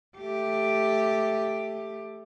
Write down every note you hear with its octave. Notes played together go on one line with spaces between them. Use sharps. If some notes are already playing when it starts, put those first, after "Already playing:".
A3 G4